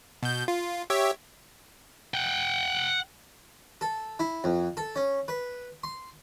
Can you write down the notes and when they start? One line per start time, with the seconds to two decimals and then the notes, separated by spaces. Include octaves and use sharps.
0.23 B2 G6
0.48 F4
0.90 G4 C#5 E5
2.14 F#5 G5
3.81 A4
4.19 E4
4.44 F2
4.77 A4
4.96 C#4
5.28 B4
5.84 C6